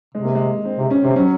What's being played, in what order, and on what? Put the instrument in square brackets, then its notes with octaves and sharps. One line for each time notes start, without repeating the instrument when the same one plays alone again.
[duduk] C3 [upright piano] G#3
[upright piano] A#3
G#3
C4
[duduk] C3 [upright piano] D#4
[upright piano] C#4
[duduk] C3 [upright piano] C4
[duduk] F#3 [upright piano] C#4